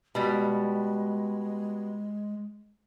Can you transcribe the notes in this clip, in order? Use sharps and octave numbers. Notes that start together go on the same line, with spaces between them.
B2 G3 G#3